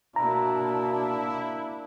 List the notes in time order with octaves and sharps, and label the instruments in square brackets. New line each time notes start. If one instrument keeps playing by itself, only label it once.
[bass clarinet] B2 [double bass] A#3 D4 [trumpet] E4 [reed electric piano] A#5